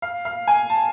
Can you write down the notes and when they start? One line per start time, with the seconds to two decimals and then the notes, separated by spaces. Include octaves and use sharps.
0.02 F5
0.25 F5
0.47 G#5
0.70 A5